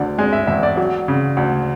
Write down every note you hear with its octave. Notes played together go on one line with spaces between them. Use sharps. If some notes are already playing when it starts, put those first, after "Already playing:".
Already playing: D2 D3 D5
G#3 G#5
E5
E1 E5
D5
F#3
C#3
D2